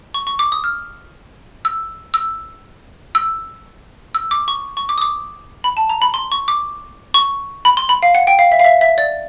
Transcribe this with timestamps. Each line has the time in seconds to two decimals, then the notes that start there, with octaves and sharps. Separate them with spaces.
0.14 C#6
0.27 C#6
0.39 D6
0.52 D#6
0.64 F6
1.65 E6
2.14 E6
3.15 E6
4.15 E6
4.31 D6
4.48 C#6
4.77 C#6
4.89 D6
4.98 D#6
5.02 D6
5.64 B5
5.77 A5
5.89 A#5
6.02 B5
6.14 C6
6.32 C#6
6.48 D6
7.14 C#6
7.65 B5
7.77 C6
7.89 B5
8.03 F5
8.15 F#5
8.27 G5
8.39 F5
8.52 E5
8.59 F5
8.64 E5
8.81 E5
8.98 D5